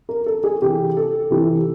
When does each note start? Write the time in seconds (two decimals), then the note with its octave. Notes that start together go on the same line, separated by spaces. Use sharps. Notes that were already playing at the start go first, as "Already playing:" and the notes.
0.09 A#4
0.26 A4
0.44 G#4
0.62 C3 E3 G4
0.97 A4
1.30 C3 E3